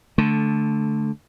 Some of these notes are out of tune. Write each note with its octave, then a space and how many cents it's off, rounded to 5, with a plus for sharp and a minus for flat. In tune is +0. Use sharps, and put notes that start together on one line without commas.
D3 -5 A3 -15